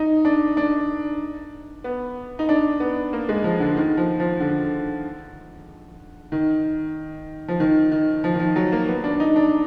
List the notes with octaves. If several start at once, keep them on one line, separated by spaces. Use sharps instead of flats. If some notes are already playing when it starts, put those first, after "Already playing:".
Already playing: D#4
D4
D4
B3
D#4
D4
B3
A#3
G#3
F3
D3
D#3
F3
F3
D3
D#3
F3
D#3
D#3
F3
D#3
F3
F#3
A#3
B3
D4
D#4
D4